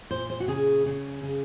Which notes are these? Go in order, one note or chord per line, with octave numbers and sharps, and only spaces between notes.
A#2 C5
C5
F#4
C#3 G#4
C#3
C#3